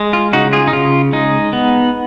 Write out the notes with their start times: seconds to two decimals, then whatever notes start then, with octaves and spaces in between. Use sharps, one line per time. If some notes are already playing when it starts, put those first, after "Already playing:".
Already playing: G#3
0.13 F4
0.33 C#3 D#4 F#4
0.53 F4 G#4
0.67 D#4
0.73 C#3 F4
1.13 G#3 D#4
1.53 B3